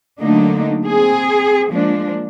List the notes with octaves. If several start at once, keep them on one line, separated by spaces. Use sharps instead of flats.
D3 F#3 A3 A#3 D4 D#4
C4 G#4
F3 G#3 A#3 D4